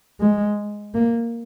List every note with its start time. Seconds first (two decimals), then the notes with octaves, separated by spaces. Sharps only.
0.20 G#3
0.95 A#3